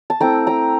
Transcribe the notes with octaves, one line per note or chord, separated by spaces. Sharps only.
A5
A3 C4 E4 G5 A#5
G5 A#5